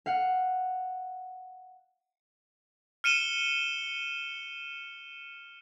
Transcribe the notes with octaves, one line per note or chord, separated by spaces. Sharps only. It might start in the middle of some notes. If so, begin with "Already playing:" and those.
F5 F#5
F6 C#7 D#7 E7 G7